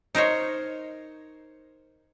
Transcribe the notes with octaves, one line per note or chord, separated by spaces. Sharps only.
D#4 A#4 C5 C#5